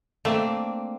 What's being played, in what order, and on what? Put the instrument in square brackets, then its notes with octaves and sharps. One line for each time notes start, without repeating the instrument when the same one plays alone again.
[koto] A3 [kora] A#3 C4 D4